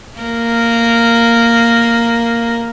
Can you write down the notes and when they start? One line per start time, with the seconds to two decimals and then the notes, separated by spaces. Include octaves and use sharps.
0.19 A#3 A#4